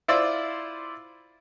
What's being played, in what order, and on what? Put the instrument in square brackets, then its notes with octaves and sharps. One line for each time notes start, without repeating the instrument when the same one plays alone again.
[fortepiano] E4 F4 C5 D5 D6 E6